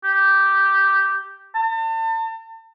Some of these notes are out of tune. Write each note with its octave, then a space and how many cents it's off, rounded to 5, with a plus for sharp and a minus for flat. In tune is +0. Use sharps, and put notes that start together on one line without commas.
G4 -5
A5 +40